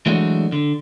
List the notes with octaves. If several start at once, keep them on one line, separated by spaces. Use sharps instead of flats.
E3 F#3 G#3 A3 D4 F#4
D3